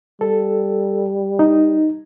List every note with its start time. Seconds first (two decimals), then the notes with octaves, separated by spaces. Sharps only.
0.21 G3 A4
1.39 D#4